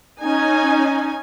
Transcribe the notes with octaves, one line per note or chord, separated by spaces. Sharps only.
C#4 D#4 G#5